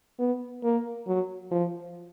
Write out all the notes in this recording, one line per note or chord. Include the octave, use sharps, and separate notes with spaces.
B3
A#3
F#3
F3